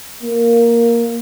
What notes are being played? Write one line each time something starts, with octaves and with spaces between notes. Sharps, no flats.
A#3